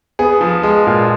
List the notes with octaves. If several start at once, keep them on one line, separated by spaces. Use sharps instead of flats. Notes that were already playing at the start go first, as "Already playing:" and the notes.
B3 G#4
F3
G#3
A#2